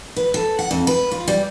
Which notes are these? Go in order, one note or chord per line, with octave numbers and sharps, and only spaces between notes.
B4
A4
F#5
F2
B4
F4
G3